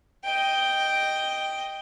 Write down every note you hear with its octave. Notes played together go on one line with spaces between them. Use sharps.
D#5 G5